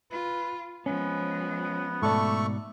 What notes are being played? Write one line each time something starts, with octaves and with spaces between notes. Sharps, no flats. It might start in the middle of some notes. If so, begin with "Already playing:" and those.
F4 B4
F3 G#3 B3 C#4
G#2 B2 A3 A4 D5 C#6